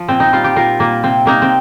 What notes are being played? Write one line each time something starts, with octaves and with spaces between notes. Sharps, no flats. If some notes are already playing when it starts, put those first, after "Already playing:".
Already playing: F3
A#2 C4
D#4
G3 F4
G4
A#2 F4 A#4
A#2 A#3
C3 C4
C3 A#3 D#4
C4